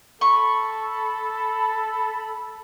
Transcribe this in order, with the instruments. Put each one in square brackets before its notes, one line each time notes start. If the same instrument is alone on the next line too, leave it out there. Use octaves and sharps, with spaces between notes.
[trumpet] A4 [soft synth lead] B5 [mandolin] C#6